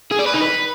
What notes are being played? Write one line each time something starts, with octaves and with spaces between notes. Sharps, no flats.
G#4
D5
B4
D#4
B4